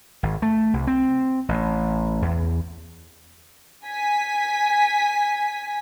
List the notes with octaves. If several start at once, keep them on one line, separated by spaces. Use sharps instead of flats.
G#1
A3
C2
C4
A1
E2
G#5 B6